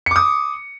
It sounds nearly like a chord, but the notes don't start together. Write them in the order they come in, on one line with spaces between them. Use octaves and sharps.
C#7 D6 D#6